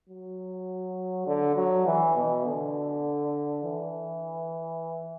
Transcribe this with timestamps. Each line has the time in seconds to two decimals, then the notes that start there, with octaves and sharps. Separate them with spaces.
0.09 F#3
1.27 D3
1.56 F#3
1.86 E3
2.16 B2
2.45 D3
3.64 E3